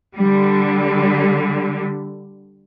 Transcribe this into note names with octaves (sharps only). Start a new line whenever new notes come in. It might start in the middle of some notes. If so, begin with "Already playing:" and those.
D3 G3